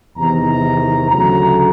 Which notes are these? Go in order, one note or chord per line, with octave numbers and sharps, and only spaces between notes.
E2 C3 D#3 A#5
D2 C#3 F#3 A3 A#5